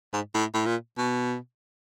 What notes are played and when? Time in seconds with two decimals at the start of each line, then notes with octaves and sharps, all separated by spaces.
0.13 G#2
0.35 A2
0.54 A2
0.66 A#2
0.98 B2